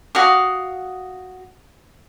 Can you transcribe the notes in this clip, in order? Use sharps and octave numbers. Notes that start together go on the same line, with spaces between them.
F#4 F5 D#6